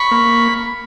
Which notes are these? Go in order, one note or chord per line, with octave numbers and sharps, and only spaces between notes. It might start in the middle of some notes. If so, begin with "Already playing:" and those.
Already playing: B5 C#6
A#3